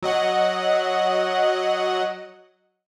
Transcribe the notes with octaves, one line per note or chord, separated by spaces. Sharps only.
F#3 D#5 F#5